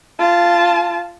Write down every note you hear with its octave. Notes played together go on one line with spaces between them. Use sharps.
F4 A5